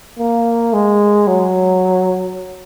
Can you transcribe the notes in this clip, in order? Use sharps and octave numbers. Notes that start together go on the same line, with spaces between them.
A#3
G#3
F#3